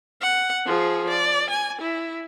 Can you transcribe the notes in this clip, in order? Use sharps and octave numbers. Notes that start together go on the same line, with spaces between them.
F#5
F3 G#4
D5
G#5
E4